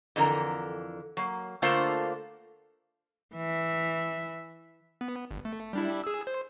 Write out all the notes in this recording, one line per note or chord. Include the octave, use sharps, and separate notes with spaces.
F2 D3 E3 A#4 A#5
F#3 A#3
D3 A3 A#3 F4 A4 C5
E3 E5
B3
G1
A3
G3 D4 E4
G#4 E6
C5